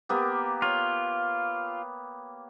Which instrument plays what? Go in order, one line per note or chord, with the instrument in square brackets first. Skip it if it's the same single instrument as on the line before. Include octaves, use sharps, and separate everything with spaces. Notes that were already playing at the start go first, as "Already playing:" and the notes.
[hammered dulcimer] A#3 B3 G4
[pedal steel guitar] F4 [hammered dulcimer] C#5